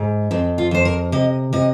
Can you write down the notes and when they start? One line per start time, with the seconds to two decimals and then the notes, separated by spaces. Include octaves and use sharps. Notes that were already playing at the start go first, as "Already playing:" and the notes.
Already playing: G#2
0.31 F2 C4
0.58 F4
0.71 F2 C5
0.85 A#4
1.12 C3 D#5
1.53 C3 D#5